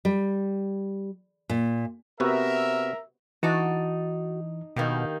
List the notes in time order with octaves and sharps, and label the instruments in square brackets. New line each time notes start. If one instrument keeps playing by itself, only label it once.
[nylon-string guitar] G3
A#2
[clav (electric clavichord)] C3 B3 F#4 [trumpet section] A#4 E5
[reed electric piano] E3 [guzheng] D#4 D5 A5 [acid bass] F#4
[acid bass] B2 [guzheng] D#3 A#3 G4